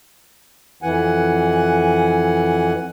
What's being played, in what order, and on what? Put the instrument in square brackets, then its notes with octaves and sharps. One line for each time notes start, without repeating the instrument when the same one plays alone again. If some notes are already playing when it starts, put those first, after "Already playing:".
[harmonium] F2 E3 F#5 G#5